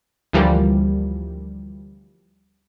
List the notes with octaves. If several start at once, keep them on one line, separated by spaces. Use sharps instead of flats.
D2 E3 F3 G3 A#3